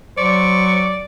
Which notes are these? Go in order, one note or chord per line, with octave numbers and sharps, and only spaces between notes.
F#3 C5 D5 C#6